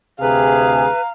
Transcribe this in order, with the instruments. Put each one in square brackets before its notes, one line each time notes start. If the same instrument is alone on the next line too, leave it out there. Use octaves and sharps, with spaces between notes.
[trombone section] D2 C3 G#4 [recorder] B4 [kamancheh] F5 [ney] A#5